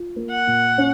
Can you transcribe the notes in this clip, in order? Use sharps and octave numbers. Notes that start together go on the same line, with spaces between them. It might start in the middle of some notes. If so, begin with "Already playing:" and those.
Already playing: F4
A#3
F#5
A#2
C#4